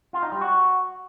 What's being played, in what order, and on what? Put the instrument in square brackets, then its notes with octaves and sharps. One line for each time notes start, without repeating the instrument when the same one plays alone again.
[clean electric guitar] F4
D#4
G3
F#4